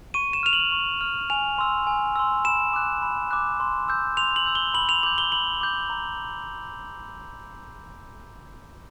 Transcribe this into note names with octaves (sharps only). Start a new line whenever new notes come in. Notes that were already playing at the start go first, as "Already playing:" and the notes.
C#6 D#7
E7
F6 F7
F#7
C#6
F6
G#5 F7
C6 E6
G#5
C6 E6
B5 E7
D6 F#6
B5
D6 F#6
C6
E6 G6
C6 F7
F#7
E6 G6
G7
B5 F#7
F7
D6 G6 F#7
G7
B5 F#7
D6 G6
A#5